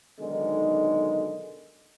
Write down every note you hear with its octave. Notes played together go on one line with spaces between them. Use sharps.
B1 D3 D#3 G#3